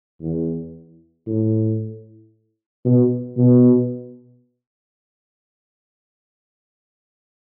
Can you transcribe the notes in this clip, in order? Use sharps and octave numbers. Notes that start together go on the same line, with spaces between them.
E2
A2
B2
B2